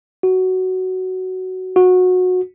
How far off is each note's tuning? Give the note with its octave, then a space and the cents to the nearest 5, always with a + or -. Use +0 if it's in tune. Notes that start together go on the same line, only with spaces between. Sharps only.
F#4 +10
F#4 -20